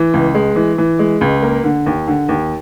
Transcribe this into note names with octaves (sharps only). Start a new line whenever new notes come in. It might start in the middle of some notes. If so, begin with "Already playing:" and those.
Already playing: E3
C#2
G#3
E3
E3
G#3
C#2
A#3
D3
D#2
D3
D#2